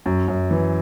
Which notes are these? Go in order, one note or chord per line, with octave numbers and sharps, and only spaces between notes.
F#2
F#2
E3